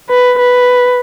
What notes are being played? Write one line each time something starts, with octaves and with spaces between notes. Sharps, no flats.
B4
B4